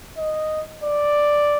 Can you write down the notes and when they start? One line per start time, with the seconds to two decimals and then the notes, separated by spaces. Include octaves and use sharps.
0.18 D#5
0.83 D5